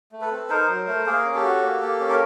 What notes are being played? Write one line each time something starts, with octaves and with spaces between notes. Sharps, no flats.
A3
A4 B4
C4
D#4 A#4 C5
F#3
A3
A#3 G#4 A#4
C#4
G4 A4
F#4
A#3
A#3
C#4
A#4